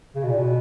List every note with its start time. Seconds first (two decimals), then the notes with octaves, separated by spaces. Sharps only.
0.15 C#3
0.23 B2
0.29 A#2
0.37 B2